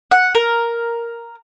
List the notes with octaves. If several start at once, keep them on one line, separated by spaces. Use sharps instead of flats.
F#5
A#4